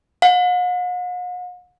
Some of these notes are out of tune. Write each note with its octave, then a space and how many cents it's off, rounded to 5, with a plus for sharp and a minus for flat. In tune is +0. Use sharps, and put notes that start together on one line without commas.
F#5 -45